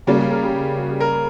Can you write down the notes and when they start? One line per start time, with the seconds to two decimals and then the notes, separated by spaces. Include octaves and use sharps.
0.07 C#3 G3 A#3 F#4
0.19 G4
0.31 A#4
0.43 G4
0.77 F#4
0.89 G4
1.00 A#4